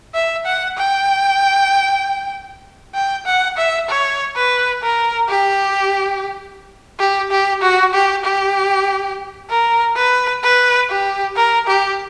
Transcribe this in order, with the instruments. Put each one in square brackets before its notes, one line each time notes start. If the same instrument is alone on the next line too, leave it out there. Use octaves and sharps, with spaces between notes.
[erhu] E5
F#5
G5
G5
F#5
E5
C#5
B4
A#4
G4
G4
G4
F#4
G4
G4
A#4
B4
B4
G4
A#4
G4